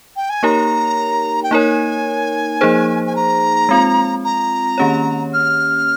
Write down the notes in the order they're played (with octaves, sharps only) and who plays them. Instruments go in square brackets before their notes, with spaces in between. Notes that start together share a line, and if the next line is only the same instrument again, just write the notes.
[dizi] G5
G#5
[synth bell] A#3 D#4 G4 A#4 C#5 [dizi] A#5
[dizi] G5
[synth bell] A#3 D#4 A#4 C#5 [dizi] G#5 A#5
[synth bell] F3 A#3 D#4 G#4 C5
[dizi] G#5
A#5
[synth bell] G#3 C4 F4
[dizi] A#5
[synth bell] D#3 A#3 C#4 G4 C#5
[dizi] F6